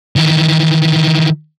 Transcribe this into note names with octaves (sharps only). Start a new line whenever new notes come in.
D#3 E3